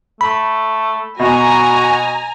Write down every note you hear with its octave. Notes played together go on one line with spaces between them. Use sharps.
A3 B5
B2 F#4 G#5 A#5